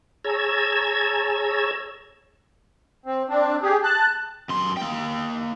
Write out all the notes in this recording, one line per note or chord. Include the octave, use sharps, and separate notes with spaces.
G#4 C#5 A5 A#5 E6 G#6
C4
C4 D4
G4 G#4
A5 F#6
F#2 C6
A#3 G5